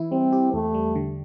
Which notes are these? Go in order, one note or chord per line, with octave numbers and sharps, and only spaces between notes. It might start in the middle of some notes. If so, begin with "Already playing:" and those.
Already playing: E3 E4
G3 C4
G4
E2 A3
G3
D3